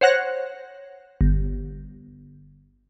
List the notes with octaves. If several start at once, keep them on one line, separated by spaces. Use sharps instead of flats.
C5 C#5 F#5 F#6 A#6
G1